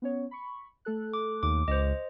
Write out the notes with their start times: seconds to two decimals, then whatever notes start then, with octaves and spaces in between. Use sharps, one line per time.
0.02 B3 C#4 C#5
0.31 B5 C#6
0.85 A3 A4 F#6
1.13 D6
1.43 D#2 D6
1.68 C#2 C5 D#5